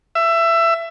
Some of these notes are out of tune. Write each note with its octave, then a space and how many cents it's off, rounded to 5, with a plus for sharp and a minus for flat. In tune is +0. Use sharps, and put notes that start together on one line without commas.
E5 +20